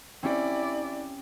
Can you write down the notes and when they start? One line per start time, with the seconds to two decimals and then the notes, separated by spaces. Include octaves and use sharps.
0.23 C4 C#4 E4 G4 D5